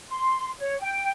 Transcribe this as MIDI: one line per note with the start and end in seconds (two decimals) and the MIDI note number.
0.09 0.48 84
0.59 0.75 73
0.79 1.12 79